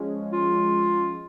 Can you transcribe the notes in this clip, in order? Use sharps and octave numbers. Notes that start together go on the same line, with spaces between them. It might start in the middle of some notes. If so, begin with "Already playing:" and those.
Already playing: F3 G#3 C#4
F4